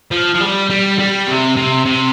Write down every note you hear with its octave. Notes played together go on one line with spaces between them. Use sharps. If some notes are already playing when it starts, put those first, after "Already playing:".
F3
F3
G3
G3
G3
C3
C3
C3